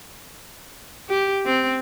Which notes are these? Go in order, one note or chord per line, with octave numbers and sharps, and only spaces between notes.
G4
C4